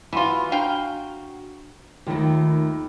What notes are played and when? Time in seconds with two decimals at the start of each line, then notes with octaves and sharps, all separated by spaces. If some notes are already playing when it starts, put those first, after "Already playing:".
0.13 E3 F4 F#4 B5 C6
0.52 D4 F5 G5 A#5
2.07 D#2 D#3 A3 F4 B5 A#6